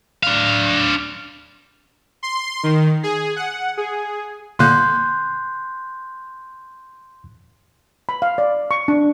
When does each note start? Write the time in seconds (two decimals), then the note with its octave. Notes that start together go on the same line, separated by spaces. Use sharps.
0.23 D4 F5
2.23 C6
2.63 D#3
3.03 G#4
3.36 F#5
3.77 G#4
4.59 A#2 D3 A#3 C6 F#6 G6
8.09 B5
8.22 F5
8.38 D5
8.71 C#6
8.88 D4